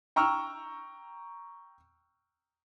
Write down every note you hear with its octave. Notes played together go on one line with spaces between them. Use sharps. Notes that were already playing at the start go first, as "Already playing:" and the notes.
G5 A#5 C#6 E6 F6